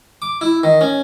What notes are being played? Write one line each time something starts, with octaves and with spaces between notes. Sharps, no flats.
D6
E4
D#3
C#4